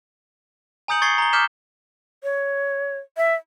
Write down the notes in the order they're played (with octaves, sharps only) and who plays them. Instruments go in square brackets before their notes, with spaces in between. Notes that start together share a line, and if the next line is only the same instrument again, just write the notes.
[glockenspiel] G#5 A#5 D#6 G6 C#7 F#7
C#6 G#6 A6 C7 C#7 G7
A#5 G7
D6 F6 G6 B6 E7 G7
[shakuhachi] C#5
E5